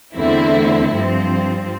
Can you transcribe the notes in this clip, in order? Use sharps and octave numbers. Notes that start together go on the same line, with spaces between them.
E2 D3 A3 C4 E4
G2 F3 C4